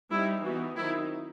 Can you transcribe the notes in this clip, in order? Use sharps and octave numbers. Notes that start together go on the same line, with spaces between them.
G3 C4 D#4 E4
E3 B3 D#4 F#4
D#3 F#3 C4 D#4 E4